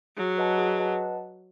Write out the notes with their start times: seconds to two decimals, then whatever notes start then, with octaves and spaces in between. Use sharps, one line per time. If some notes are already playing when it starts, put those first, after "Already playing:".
0.17 F#3 G#4
0.38 B4 D#5 F#5 A5
0.58 G#4
0.79 B4 D#5 F#5 A5